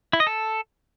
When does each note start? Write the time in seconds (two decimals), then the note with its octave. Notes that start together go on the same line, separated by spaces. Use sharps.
0.13 E4
0.20 D#5
0.27 A4